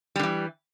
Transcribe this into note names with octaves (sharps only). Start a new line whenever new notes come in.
D3 E3 G3